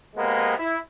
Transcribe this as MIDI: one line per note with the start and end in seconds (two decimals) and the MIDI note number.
0.16 0.57 48
0.16 0.57 56
0.16 0.57 58
0.16 0.57 59
0.58 0.77 64